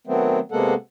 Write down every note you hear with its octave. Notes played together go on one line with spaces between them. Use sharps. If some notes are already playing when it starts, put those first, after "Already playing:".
D#3 F#3 A3 B3 C4
C3 G#3 A#3 B3 A4 F#5